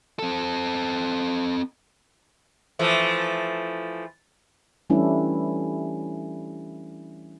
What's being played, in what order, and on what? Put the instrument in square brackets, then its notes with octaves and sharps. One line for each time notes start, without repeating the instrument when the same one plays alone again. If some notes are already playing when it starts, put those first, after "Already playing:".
[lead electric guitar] C4 A4
[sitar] E3 F3 A3
[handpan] E3 G3 A3 C#4 D4 E4